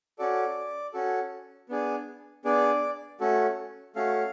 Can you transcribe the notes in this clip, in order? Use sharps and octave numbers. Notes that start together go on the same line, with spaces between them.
C#4 F#4 A4 D5
C#4 F#4 A4
B3 D4 G#4
B3 D4 G#4 D5
A3 C#4 F#4 A4
A3 C#4 F#4 A4 F5